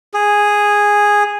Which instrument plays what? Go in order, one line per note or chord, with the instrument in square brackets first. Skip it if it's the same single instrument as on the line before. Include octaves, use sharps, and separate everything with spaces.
[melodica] G#4